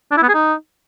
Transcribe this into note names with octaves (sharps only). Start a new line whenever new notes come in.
D4
E4
B3
G#4
D#4